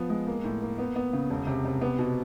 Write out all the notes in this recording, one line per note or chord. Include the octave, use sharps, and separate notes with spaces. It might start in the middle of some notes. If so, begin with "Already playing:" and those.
Already playing: F3 B3
G#3
A#3
A2
A#3
B3
B3
C#3
E1
C3
C3
B3
B2